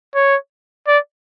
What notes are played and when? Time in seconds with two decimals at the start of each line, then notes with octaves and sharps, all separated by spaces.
0.15 C#5
0.87 D5